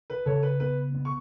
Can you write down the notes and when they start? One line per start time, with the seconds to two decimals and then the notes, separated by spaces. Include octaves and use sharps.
0.10 B4
0.26 C#3 A4 C#5
0.43 B4
0.60 B3 B4
0.94 B3
1.05 C#6